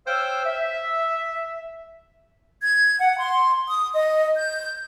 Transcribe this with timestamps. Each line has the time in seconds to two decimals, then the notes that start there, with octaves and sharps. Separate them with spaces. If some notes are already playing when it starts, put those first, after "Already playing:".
0.06 C5 C#5 F5 G5 E6
0.45 E5
2.62 G#6
3.01 F#5
3.19 C6
3.68 D#6
3.94 D#5
4.36 G6